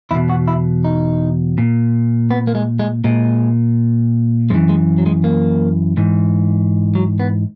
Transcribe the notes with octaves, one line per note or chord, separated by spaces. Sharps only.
E2 B2 E4
F#4
E4
D#4
A#2
B3
A#3
G#3
G#3
A#2 G#3
F#2 E3 G#3
G#3
F#3
G#3
A#3
G#2 E3
F#3
B3